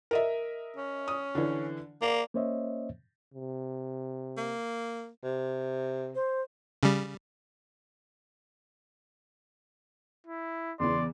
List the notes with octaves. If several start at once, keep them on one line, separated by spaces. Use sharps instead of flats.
A#4 D#5 E5
C#4
D#6
D3 E3
A#3 D5
A#3 C#4 C5 C#5 D#5 E5
C3
A#3
C3
C5
C#3 G3
E4
E2 C#3 E3 D5 C6